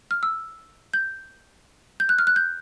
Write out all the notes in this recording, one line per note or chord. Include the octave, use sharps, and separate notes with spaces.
F6
E6
G6
G6
F#6
F6
F#6
G6